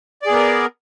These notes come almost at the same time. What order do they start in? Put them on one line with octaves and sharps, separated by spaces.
D5 G#4 B3 A#4